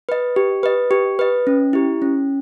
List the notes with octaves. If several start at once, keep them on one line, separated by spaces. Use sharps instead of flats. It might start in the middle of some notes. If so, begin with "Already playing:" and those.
B4 D#5
G4
B4 D#5
G4
B4 D#5
C#4
E4 G4
C#4